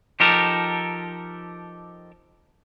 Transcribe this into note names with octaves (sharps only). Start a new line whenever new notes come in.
F3 D#4 G4 A4 A#4